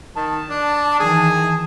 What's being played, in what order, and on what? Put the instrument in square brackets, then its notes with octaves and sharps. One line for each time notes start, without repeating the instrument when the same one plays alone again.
[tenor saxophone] D#3 [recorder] A5
[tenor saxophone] D4
[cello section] D#3 E3 [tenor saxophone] G#4